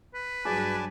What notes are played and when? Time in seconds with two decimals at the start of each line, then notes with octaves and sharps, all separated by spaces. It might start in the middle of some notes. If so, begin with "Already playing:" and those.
0.14 B4
0.45 G2 F#3 F#4 G#4 D5 G#5 A5 D6